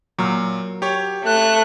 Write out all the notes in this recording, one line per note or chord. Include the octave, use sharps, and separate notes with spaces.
A#2 F#3 A#4
G4 C#5
A3 F#6